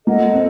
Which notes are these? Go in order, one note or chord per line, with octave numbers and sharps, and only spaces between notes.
A#3 A4 D#5 F#5
C4